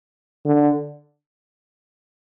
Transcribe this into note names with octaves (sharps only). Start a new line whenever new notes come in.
D3